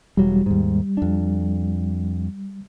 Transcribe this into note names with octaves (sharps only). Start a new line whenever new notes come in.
E1 F#3 G3
D#2 G#2
F2 D4